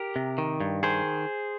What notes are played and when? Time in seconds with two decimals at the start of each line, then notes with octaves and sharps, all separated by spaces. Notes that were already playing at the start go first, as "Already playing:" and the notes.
Already playing: G4 A#4
0.16 C3
0.38 D#3
0.60 G2
0.83 D#3 G#4 C5